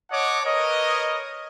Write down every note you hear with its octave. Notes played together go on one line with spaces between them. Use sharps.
C#5 D#5 F#5 A5 D6
A#4 B4 C#5 D#5